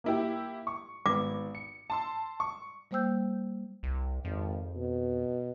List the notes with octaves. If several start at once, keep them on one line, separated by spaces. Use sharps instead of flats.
A#3 E4 G4
C#6
G#1 B3 D6
C#7
A5 C6 E6
C#6
G3 A#3 C5 G5 E6 G6
C2
G#1 F2
B2